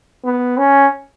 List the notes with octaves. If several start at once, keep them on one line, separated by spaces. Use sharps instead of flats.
B3
C#4